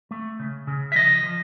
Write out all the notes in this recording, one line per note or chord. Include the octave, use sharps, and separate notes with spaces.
A3
C#3
C#3
E5
F3 D#5
F3